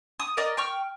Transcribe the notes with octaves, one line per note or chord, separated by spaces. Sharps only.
D#6
A#4 D5 D#5
G5 C#6 F6